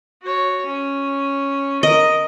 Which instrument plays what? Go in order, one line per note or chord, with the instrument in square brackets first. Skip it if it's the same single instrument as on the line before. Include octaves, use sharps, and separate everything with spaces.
[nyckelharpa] F#4 C#5
C#4
[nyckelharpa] A#4 [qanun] D#5